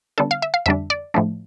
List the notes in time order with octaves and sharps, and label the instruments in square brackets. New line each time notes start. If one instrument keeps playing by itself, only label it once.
[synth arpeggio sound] D3 G3 B3 D4 A4
F5
E5
F5
F2 D3 G3 D4 E5
D5
A2 F3 A3 D4